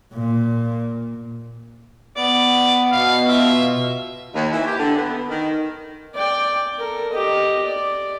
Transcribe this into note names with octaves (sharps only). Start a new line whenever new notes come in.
A#2
B3 D5
B2 F5
F4 E5
D#2
E3
G4
D3
B3
D#3
D5 G5
A4 A#4
G4 D#5
D5